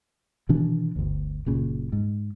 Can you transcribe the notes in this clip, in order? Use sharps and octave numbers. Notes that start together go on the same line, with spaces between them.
B2 D#3 E3 D4
G1 D2
F#1 A#2 C#3
G#2